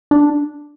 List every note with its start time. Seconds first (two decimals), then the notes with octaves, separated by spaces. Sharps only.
0.11 D4